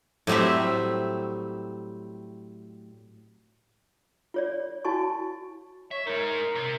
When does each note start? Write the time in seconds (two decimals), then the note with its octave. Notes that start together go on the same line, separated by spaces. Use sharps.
0.27 A2 F#3 G3 C4 E5
4.34 F4 C#5 D5
4.84 E4 F#4 G#5 A5 C#6
5.91 C#5 E5
6.07 G#3 D#4 A#4
6.55 C3